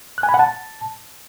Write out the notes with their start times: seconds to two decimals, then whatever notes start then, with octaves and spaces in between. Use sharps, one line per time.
0.18 F#6
0.23 G#5
0.29 B5
0.34 F#5
0.39 A5